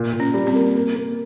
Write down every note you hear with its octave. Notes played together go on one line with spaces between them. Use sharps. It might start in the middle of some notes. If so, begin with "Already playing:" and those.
Already playing: A#2
A#2
C#4
G3
C4
A#3
A#3
A#3